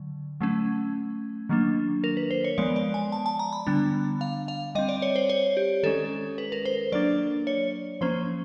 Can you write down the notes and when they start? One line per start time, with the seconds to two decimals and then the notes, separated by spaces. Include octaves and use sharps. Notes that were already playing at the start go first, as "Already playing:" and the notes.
Already playing: D3 F#3
0.41 F#3 A3 C#4
1.49 D#3 F#3 A#3 D4
2.04 A#4
2.17 B4
2.31 C5
2.44 C#5
2.58 F3 G#3 B3 D5
2.76 D5
2.94 G#5
3.12 A5
3.26 A5
3.39 A#5
3.53 B5
3.67 D3 G3 B3 D4
4.21 F5
4.48 F5
4.75 G3 C4 D#5
4.89 D5
5.02 C#5
5.16 C5
5.30 C#5
5.57 G4
5.83 D#3 G#3 C#4 A4
6.38 B4
6.52 A#4
6.65 C5
6.92 F#3 A#3 D4 D5
7.47 C#5
8.01 F3 A#3 C#4 C5